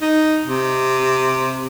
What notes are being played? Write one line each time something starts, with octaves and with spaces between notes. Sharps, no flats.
D#4
C3